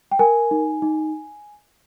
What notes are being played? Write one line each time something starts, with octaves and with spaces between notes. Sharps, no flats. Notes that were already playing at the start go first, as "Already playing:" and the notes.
G5
A#4 G#5
D#4
D#4